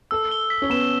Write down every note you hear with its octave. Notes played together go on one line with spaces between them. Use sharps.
A4 E6
G7
B6
C#4
B3 E7